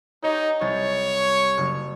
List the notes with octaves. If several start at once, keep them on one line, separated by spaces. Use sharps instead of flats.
D#4 G4 C#5 D#5
C2 C#5 A6
F#1